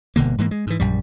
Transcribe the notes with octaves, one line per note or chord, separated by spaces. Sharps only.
G1 B2 D3 A#3
G#2 E3 G3 A#3
G#3
G#2 E3
A#1 F#2 G3